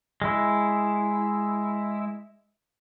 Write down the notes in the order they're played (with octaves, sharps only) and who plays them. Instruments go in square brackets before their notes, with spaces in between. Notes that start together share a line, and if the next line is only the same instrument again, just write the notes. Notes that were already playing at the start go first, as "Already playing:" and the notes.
[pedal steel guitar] G#3 E4